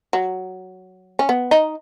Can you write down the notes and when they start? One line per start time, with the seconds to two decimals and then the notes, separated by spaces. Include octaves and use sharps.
0.13 F#3
1.19 C#4
1.29 B3
1.51 D#4